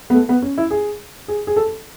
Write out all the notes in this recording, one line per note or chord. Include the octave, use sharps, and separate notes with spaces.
B3
A3
B3
C#4
E4
G#4
G#4
G#4
A4